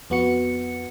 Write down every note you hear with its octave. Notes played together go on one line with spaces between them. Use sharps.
F2 B3 F#4 C#7